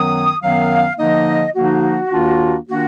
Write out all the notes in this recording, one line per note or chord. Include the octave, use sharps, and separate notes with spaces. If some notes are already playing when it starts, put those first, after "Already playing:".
Already playing: F#2 D#3 F#3 B3 D#6
F#2 D#3 F#3 B3 F5
D3 F3 A#3 D#4 D#5
D3 F3 A#3 D#4 F#4
D#2 D#3 A#3 D4 F4
D#3 A#3 D4 F4 F#4